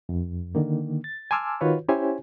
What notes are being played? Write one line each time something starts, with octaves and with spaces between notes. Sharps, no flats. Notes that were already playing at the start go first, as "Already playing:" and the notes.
F2
D3 D#3 A#3
A6
G#5 A5 C6 D6 E6 F6
D#3 F4 F#4 B4 C#5
C#4 E4 G4 C5 C#5 G#5